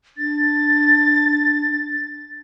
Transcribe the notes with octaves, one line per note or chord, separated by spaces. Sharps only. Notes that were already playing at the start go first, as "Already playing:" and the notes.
D4 A6